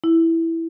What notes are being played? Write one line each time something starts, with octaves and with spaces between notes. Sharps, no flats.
E4